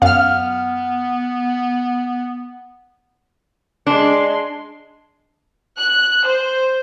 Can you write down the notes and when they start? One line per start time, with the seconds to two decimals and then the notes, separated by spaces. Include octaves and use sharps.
0.02 F#2 B3 F5 F6
3.87 G#3 D4 C6
5.78 F#6
6.26 C5